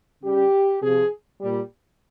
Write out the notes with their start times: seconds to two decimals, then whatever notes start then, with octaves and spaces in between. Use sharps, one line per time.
0.24 C#3 G3 G4
0.82 C3 F3 G#4
1.40 A#2 G3